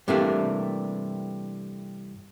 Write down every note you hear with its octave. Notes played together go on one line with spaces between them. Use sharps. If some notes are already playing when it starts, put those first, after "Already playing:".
G2 C3 E3 A3 A#3 D4